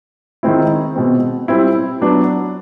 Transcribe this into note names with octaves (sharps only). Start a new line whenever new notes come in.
D#3 G#3 C4 E4
B2 G#3 C4
G3 C4 E4
F#3 B3 D4